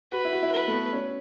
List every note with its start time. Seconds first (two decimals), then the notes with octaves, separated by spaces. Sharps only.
0.12 F#4 B4
0.25 E4
0.33 F#4
0.43 E4
0.52 B4
0.68 A3
0.72 B3
0.93 C#4